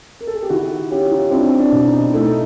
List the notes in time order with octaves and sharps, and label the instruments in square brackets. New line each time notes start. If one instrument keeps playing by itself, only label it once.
[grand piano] A#4
A4
G#4
G4
D#3 E4 F#4
C#4 F4 G4
D#4 F4
C4 D4 E4
D4
B2
D#4
A3 E4
D#4